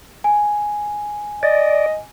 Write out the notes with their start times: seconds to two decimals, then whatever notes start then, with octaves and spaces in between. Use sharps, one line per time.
0.24 G#5
1.43 D5 D#5